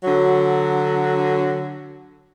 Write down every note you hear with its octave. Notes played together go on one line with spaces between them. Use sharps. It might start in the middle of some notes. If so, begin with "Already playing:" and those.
D3 F#3